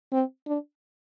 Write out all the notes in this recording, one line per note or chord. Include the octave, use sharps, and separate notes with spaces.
C4
D4